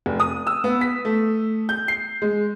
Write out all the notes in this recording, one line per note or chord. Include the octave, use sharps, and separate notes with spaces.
F1
D#6
E6
B3
B6
A3
G6
C7
G#3